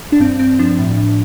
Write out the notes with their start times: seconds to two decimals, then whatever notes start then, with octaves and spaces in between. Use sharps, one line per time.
0.12 D4
0.20 G2 C4
0.39 G2 C4
0.59 F3 D4
0.79 A2
0.97 A2